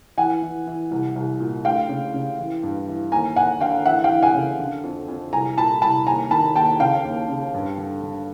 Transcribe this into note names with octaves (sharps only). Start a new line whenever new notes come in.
E3 F#5 G#5
E3
E3
C2
C2
A#2
D2 F5 G5
C#3
C#3
E3
G2
E3
D#2 G#5 A#5
D#2 F#5 G#5
D3 F5 G5
E3 E5 F#5
F5 G5
E3
F#5 G#5
C#3
D3
F2
F2
C2 G#5 A#5
A#2 A5 B5
C2 A5 B5
D#2 G#5 A#5
D#3 A5 B5
D#2 G5 A5
C#3 F5 G5
D#2
C#3
G2
D3
D3